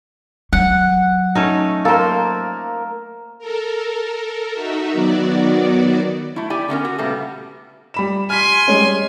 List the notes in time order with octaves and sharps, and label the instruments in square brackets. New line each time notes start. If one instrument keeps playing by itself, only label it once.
[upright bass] F#3 [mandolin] F#5
[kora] A3 C#4 D#4
[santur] A#3 A#4 [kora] A4 C5
[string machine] A4 A#4
D#4 F#4 E5
D#3 F#3 B3 F#4 D5
[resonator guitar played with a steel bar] A3 E4
E4 G4 D5 G#5
D3 B3 C#4 A#4
F#4
A#2 C#3 G3 A3 B3
[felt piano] G3 B5 E7
[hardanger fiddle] G#5 C6 [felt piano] F6 B6
[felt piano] G3 G#3 C#4